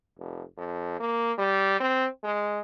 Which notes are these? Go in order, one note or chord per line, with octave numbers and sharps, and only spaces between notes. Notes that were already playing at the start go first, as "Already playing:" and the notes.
F1
F2
A#3
G3
C4
G#3